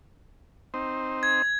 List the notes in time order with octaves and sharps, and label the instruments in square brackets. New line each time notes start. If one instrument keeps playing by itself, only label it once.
[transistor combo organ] C4 D#4 C5
[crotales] G#6